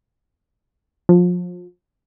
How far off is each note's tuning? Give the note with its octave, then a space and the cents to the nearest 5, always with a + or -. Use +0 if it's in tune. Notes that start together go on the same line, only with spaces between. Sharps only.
F3 +30